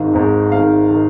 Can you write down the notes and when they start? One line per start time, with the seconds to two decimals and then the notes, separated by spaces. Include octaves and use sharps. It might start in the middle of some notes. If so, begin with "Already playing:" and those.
Already playing: G#1 G#2 D#3 F5
0.14 G#1 G#2 D#3
0.52 G#1 G#2 D#3 F5
0.89 D#3